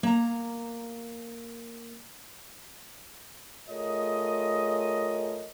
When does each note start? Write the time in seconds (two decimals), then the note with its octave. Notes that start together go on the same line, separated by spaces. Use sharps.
0.03 A#3 A#5
3.68 A3 F4 G#4 A#4 C#5 D#5